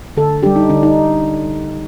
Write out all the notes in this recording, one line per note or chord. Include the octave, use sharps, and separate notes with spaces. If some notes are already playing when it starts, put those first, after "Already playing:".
D3 A4
G3 D4 G4
D#4
D3 D4
D#4